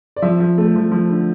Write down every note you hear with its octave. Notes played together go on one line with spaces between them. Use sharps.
D5
F3 E5
F3
A3
F3
F3
D3